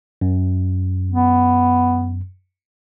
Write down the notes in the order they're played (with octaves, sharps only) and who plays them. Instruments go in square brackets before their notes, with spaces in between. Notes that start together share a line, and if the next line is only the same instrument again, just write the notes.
[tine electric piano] F#2
[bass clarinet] B3